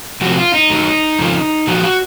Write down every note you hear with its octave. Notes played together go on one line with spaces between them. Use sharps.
F2 C3 F3 F#4
F#4
F4
D#4
F#2 D#3 F#3
F2 C#3 F3
A#2 F3 F#4
F#4